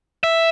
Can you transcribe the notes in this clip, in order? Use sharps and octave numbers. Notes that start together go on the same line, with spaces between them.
E5